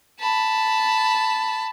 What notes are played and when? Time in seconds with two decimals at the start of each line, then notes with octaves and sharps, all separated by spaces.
0.20 A5 B5